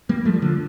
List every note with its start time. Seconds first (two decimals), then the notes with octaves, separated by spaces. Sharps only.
0.09 G3 A#3
0.25 F3 A3
0.34 G3
0.42 D3 F3